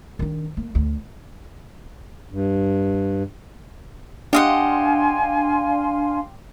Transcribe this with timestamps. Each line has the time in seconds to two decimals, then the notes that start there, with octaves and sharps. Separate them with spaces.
0.19 D#3 D4
0.57 A#3
0.75 D2
2.31 G2
4.33 D4 G4 D#5 F5 F#5 G#5 C6